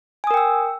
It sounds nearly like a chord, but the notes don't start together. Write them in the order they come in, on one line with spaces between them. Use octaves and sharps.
G#5 D#6 A#4 G5 E6